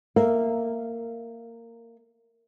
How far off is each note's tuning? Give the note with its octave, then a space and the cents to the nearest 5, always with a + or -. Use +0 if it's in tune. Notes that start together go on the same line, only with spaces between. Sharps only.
A#3 -15 E5 +0